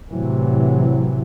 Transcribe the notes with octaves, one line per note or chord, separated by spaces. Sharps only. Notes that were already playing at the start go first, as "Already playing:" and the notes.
A2 C3 E3 F#3